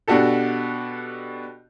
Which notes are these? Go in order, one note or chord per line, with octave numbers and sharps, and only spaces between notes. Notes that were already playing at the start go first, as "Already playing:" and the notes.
B2 D4 F#4 G4 A4